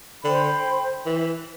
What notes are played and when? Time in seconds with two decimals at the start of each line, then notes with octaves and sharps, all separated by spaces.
0.23 D3 C5 G5 B5
1.06 E3